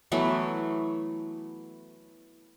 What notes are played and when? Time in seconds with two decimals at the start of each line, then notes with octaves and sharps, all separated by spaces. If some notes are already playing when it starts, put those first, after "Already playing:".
0.12 E3 F#3 A3 B3